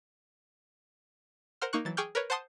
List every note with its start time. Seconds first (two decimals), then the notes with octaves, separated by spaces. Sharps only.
1.62 A#4 C5 F#5 C6 F6
1.73 A#3 D#4 C#6 F#6
1.85 E3 F#3 A6
1.97 G#4 G5 C#6 D6 F6 G6
2.15 A#4 B4 C#5
2.30 C5 F#5 A5 C6 D#6